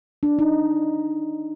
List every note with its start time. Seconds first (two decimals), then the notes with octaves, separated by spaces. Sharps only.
0.23 D4
0.39 D#4